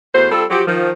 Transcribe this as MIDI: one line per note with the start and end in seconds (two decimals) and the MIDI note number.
0.14 0.28 40
0.14 0.28 57
0.14 0.28 66
0.14 0.28 72
0.31 0.44 55
0.31 0.44 60
0.31 0.44 65
0.31 0.44 69
0.50 0.62 53
0.50 0.62 54
0.50 0.62 66
0.50 0.62 67
0.67 0.90 51
0.67 0.90 53